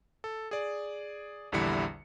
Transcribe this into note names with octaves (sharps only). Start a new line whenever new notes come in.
A4
G#4 D5
A#1 E2 D3 G3 E4 C#7